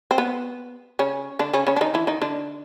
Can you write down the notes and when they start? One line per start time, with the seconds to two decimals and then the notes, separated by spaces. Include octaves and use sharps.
0.11 C4
0.18 B3
0.99 C#3 C#4
1.39 D3 D4
1.53 C#3 C#4
1.67 C#3 C#4
1.76 D4
1.81 D#3 D#4
1.94 E3 E4
2.07 D#3 D#4
2.22 D3 D4